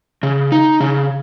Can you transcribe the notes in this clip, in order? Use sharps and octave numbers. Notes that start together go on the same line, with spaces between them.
C#3
D#4
C#3